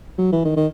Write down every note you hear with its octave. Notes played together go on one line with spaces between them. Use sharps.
F#3
E3
D#3
D#3